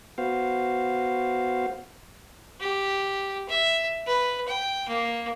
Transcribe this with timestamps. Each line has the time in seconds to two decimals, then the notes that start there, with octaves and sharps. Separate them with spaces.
0.18 B3 F#4 C5 F5
2.60 G4
3.49 E5
4.06 B4
4.48 G5
4.88 A#3